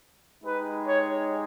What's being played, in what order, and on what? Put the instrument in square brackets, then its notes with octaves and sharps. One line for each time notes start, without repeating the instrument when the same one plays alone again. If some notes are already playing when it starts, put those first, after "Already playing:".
[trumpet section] G#3 D#4 G4 B4
C#5